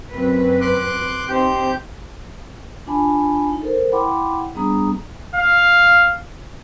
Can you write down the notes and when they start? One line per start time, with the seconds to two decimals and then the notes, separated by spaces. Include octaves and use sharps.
0.12 F#2 C4 B4
0.61 C6 D6 F#6
1.28 C4 D#4 G4 C5 G6
2.87 D4 F4 G#5 A5 B5
3.50 D#4
3.62 A4 A#4 C5
3.92 E4 F#5 G5 B5 C6 D6
4.55 G3 B3 D4 G#4 A#5 D#6
5.36 F5